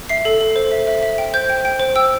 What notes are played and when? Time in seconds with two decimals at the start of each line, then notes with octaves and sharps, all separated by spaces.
0.09 E5 C7
0.25 A4
0.41 A4
0.56 C5
0.71 E5
0.87 E5
1.03 E5
1.18 G5
1.34 C5 G6
1.49 G5
1.65 G5
1.80 C5
1.96 G5 E6